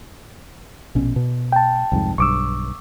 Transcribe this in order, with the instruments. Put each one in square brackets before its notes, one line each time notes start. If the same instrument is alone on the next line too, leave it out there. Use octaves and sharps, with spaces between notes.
[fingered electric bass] A#1 B2 C#4
B2
[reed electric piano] G5 A5
[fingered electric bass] C2 F2 G#2
[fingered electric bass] B1 G2 [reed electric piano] C#6 D6 E6